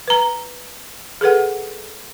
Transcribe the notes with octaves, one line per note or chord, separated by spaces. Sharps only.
B4 A#5
G#4 A4 B4 F#5